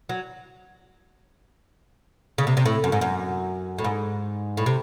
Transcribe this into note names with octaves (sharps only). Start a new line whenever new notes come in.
F#3
C#3
C3
C3
A2
F#2
G#2
F#2
A2
G#2
A2
C3